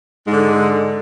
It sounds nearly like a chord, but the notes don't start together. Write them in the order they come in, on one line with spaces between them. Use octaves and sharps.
G#3 G#2 D3